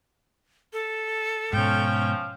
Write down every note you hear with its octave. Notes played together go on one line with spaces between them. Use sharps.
A4
G#2 B2 F3 C#4 G5